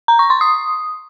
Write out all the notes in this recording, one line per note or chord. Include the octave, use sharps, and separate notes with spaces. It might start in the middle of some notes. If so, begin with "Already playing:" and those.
A#5
C#6
C6
D#6